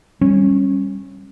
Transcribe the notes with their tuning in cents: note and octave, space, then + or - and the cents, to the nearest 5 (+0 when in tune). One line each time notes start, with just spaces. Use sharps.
G3 +5 C#4 -20